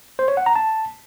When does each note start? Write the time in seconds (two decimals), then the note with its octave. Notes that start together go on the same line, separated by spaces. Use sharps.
0.19 C5
0.28 C#5
0.37 F#5
0.46 A#5
0.56 A5